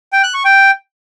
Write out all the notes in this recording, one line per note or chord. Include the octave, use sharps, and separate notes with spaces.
G5
F#6
C#6
G5